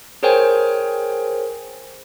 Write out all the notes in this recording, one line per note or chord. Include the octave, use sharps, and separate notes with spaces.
G#4 A#4 C5 C#5 G5 G#5